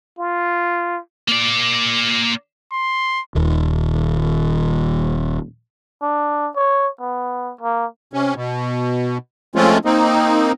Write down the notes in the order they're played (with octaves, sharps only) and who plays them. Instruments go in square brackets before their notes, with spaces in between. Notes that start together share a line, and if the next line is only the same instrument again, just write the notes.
[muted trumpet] F4
[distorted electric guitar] A#3 D5
[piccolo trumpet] C6
[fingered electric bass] D#1 D#2
[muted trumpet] D4
C#5
B3
A#3
[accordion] C3 C#4
B2
F3 G#3 A3 C4 C#4 F4
A#3 C4 D#4